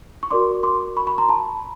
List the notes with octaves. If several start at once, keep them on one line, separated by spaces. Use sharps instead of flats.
C#6
F#4 A#4 D5 C6 D6
C6 D6
B5 C#6
B5 C#6
A#5 C6
A5 B5